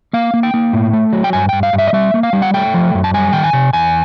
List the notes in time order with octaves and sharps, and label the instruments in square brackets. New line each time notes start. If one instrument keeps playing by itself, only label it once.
[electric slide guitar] A#3 F5
A#3
G5
A#3
A2
A3
F#3
G5
G2 G#5
G2 G5
F5
G2
E5
D#5
G3 E5
A#3
F5
G3
F#5
A3 G5
F3
F#2
A5
G3 G#5
D#3 G5
G#5
C3
E2 G#5